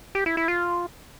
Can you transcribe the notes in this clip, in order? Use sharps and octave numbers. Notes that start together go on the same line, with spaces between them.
G4
E4
E4
F4